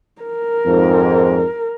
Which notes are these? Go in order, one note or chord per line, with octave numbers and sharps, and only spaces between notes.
A#4
F2 G#2